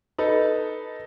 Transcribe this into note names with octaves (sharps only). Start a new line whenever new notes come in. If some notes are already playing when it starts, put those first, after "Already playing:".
D#4 A4 B4